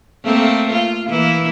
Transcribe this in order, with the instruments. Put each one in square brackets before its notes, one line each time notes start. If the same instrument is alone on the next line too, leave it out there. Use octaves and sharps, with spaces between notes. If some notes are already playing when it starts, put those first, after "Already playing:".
[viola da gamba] A3 A#3 C4
F4
E3 A#3 E4